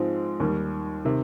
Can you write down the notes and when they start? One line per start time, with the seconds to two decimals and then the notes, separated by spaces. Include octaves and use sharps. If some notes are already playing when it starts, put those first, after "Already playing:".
Already playing: G#2 F3 G#3 C4
0.40 D#2 D#3 G3
1.05 C3 D#3